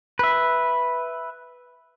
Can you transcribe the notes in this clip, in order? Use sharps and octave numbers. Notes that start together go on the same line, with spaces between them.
B4 E5